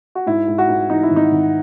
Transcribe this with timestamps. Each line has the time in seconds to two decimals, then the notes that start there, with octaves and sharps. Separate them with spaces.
0.15 F#4
0.26 G#2 E4
0.48 G#2
0.58 F#4
0.69 G#2
0.90 E3 D#4
1.03 E4
1.10 G#1
1.16 D#4
1.32 G#1